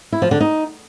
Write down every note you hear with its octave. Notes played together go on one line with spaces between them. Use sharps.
E4
F3
D3
D#4